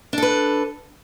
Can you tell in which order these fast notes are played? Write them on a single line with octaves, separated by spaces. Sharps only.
D4 A4 B4